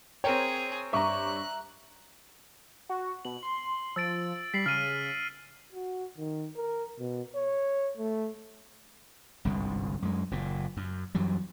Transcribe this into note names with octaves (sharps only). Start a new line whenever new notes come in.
C4 G#4 A#4 C#5 G5
G2 E5 A#5 C#6 D6 F#6
F#4
B2 F#7
C6
F3 E6 A6 D7
G3 B6 C7 F#7
C#3 F6 D#7
F#4
D#3
A#4
B2
C#5
A3
G1 C2 G#2 D3
F#2 G#3
F#1 A#2
F#2
F#2 E3 F#3 G3